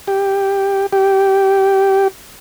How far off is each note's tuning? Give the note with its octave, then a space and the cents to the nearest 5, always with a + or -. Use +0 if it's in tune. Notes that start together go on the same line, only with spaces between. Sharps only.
G4 +5
G4 -15